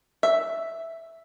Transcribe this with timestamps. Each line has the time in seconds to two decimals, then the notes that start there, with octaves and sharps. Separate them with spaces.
0.23 E5